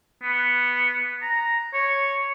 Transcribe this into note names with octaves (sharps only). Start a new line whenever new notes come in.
B3
A#5
C#5